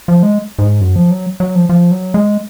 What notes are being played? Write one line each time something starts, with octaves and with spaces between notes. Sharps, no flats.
F3
G#3
G#2
F#2
F3
F#3
F#3
F3
F3
F#3
G#3